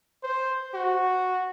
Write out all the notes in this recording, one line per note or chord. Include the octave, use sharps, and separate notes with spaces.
C5
F#4